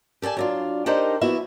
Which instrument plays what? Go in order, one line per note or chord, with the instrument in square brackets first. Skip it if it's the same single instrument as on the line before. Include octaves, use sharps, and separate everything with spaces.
[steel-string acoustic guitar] G4 A4 D5 G#5 A5
F#3 D4 F4
D4 D#4 G4 A4 A#4 C5
F3 B3 E4 F#4 E5